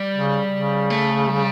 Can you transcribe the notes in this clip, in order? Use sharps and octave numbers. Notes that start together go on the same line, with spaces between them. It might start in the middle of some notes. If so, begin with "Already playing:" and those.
Already playing: G3
C#3
C#3
A3
G3